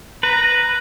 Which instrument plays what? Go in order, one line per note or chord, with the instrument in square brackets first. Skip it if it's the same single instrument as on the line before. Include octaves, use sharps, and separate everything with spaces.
[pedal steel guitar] B4 [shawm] A#5